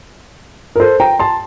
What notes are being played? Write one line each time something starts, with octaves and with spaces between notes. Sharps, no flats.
A#4
A4 C5
G5 A#5
A5 C6